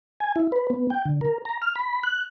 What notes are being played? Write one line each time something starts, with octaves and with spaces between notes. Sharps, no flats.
G#5
E4
B4
B3
G5
D3
A#4
A#5
F6
B5
F#6